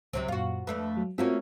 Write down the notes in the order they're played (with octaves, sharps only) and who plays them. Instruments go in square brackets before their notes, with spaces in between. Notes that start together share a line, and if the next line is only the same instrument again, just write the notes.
[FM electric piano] C#2 [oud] C3 F#3 C4
[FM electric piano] F#2 A#2 [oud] F4 F#4
[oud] F2 A3 D4 [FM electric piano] B4
[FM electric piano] F#3
[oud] A3 A#3 C#4 [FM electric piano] C4 F4 F#4